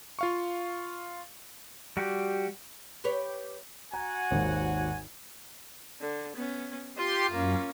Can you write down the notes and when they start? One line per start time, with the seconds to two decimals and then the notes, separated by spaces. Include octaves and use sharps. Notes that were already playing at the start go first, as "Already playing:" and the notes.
0.19 F4 F5 C#6
1.97 G3 F#4 G4
3.04 G4 B4 C#5
3.94 F#4 F#5 G#5 A#5
4.31 G#1 D#2 G#2
6.01 D3
6.37 B3 C#4
6.97 F4 G4 C6
7.31 F#2 A#3 C#4